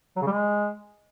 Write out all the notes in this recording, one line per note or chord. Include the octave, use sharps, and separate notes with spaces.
F#3
C#3
G3
G#3